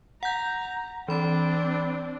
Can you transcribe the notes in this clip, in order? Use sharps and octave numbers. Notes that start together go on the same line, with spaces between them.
F#5 A#5 G6
E3 C4 D4 B5